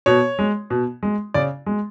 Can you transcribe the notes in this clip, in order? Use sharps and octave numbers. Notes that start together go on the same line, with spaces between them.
B2 C#5
G#3
B2
G#3
C#3 D5
G#3